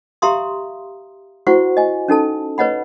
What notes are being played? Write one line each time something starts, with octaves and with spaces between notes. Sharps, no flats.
G4 E5 F5 A#5 C6 D#6
E4 F#4 C5 F#5 C#6
D#5 G#5
C#4 D#4 A4 A5
B4 C#5 D#5 F#5 B5